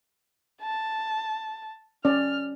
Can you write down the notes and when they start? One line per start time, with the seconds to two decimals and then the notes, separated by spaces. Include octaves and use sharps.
0.62 A5
2.05 C#4 D5 F6